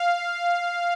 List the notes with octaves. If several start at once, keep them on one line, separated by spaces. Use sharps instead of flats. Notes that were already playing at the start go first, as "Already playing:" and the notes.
Already playing: F5